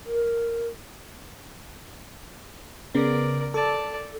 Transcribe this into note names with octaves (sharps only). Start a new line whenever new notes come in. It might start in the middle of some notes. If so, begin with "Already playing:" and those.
A#4
C#3 B3 A#4 D5
A4 D5 A5